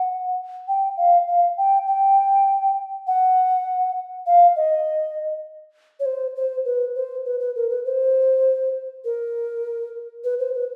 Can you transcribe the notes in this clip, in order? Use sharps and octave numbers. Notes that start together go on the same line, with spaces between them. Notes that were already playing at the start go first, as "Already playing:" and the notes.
Already playing: F#5
G5
F5
F5
G5
G5
F#5
F5
D#5
C#5
C5
C5
B4
C5
B4
B4
A#4
B4
C5
A#4
B4
C5
B4